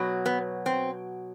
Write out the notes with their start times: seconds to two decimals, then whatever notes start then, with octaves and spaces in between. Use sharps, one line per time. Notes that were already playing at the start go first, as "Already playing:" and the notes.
Already playing: B2 F#3
0.26 B3
0.66 C4